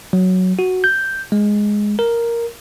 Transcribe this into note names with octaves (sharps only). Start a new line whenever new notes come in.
F#3
F#4
G6
G#3
A#4